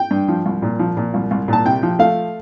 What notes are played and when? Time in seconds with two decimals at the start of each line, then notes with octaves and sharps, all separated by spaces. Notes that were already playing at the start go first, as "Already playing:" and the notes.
Already playing: G5
0.11 G2
0.28 F3
0.46 C2
0.62 A#2
0.79 F3
0.97 A#2
1.14 C2
1.31 C2
1.48 A#2 A5
1.65 C3 G5
1.83 F3
1.99 A3 F5